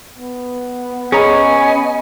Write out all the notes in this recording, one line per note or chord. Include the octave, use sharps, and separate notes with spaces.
B3
C#4 G#4 C#5 D#5 G#5 A#5 B5